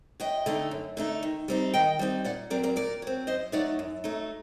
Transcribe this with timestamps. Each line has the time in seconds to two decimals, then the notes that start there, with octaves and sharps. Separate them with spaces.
0.20 F#2 D#5 G5
0.46 D3 A3 D#4
0.71 F#2
0.97 D3 A3 D#4
1.23 D#3
1.48 G3 C4 D#4
1.74 D#3 D#5 G5
1.99 G3 C4 D#4
2.25 A#2 D5 F#5
2.50 F#3 C4 A#4 D5
2.63 A#4 D5
2.76 A#2 A#4 D5
3.02 F#3 C4
3.27 F#2 C5 D#5
3.52 F#3 A3 D#4 D5 F#5
3.79 F#2
4.04 F#3 A3 D#4